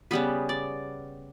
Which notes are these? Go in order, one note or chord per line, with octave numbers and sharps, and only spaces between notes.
C#3 G3 B3 B4
D5